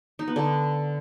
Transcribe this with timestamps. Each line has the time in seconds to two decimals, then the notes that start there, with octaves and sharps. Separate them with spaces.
0.19 D#4
0.28 B3
0.36 D3